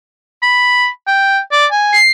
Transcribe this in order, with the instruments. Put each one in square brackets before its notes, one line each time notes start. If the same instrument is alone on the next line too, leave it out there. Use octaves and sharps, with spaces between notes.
[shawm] B5
G5
D5
G#5
[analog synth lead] C7